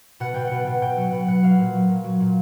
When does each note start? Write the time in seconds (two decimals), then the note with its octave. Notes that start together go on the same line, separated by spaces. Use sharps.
0.20 B2 F#5
0.34 B2 G5
0.47 B2 F#5
0.67 B2
0.82 B2 G5
0.97 F#3 F#5
1.12 B2 F#5
1.28 B2 F#5
1.43 F#3 F5
1.59 A#2
1.74 F#3
1.89 A#2
2.04 F#3
2.20 A#2